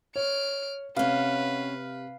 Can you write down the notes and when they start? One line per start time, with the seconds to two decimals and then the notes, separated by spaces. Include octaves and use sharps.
0.16 C#5 F6 D7
0.96 C3 B3 C#4 B4 F5